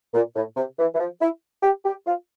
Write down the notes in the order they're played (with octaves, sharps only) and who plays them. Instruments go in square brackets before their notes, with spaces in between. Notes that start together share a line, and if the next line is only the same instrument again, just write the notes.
[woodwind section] A#2
A2
C3
E3
E3
F3
E4
G4
G4
F4